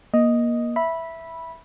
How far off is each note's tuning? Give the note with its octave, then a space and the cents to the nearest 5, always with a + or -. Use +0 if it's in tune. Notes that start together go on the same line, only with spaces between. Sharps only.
A#3 +25 D#5 +0
E5 +0 B5 -10